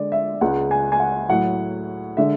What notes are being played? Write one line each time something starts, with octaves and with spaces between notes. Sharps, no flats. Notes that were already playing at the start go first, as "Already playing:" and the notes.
Already playing: D3 G#3 D5
E5
C#2 C#3 G#3 F#5
G#5
G#5
F#5
A2 F#3 F#5
D3 G#3 E5